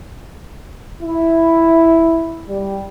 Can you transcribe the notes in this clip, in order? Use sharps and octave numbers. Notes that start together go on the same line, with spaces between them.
E4
G3